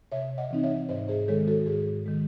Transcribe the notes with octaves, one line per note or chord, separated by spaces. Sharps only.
C3 C#5 E5
D#5 F#5
E3 C4 D#4
C#5 E5
G#2 C5 D#5
G#4 C5
D#3 G#3 A4 C#5
F#4 A4
G#2 G#4
D#3 G#3